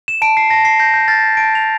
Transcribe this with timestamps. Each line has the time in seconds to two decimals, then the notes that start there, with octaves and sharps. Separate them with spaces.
0.08 E7
0.22 A5 D7
0.37 C7
0.50 A5 A#6
0.65 C7
0.79 G6 A#6
0.94 G6
1.08 F6 A6
1.37 A5 D7
1.55 F7